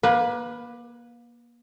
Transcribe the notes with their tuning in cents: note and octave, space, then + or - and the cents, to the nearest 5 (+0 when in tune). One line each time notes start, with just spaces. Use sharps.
A#3 +30 B4 +0